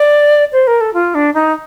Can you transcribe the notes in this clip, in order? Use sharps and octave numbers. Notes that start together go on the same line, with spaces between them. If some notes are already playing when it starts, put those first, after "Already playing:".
Already playing: D5
C5
A#4
A4
F4
D4
D#4